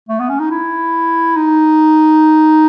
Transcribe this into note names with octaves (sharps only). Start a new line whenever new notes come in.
A3
B3
C#4
D#4
E4
D#4